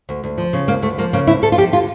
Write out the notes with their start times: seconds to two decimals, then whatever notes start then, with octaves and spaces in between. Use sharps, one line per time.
0.09 D2
0.24 D2
0.38 F3
0.53 C#3
0.67 D2 A#3
0.82 D2 A3
0.98 F3 A#3
1.13 C#3 A#3
1.27 D2 E4
1.42 D2 A4
1.52 F4
1.57 F3 G4
1.72 D3 F4